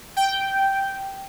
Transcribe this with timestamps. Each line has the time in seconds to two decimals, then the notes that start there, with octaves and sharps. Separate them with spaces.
0.17 G5